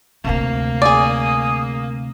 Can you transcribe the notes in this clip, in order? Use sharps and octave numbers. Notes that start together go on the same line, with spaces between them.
D2 C3 A#3
G#4 D5 G#5 D#6